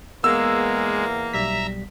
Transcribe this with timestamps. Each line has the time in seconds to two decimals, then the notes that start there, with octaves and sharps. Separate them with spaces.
0.24 E2 G#3 A#3 B3 E6
1.34 B1 G3 E5 A#5 B6